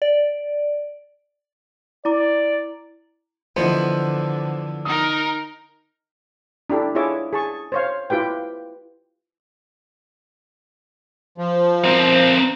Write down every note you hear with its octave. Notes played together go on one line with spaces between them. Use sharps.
D5
E4 D5 A#5 D6
D3 E3 F3 B3 C5 D5 D#5
D#4 A#4 D#6
D4 E4 G4 A4
E4 F4 G#4 C#5 E5 D6
G#4 A5 C#6
C5 C#5 F5
E4 F4 G4 B4 G5
F3
C4 A#4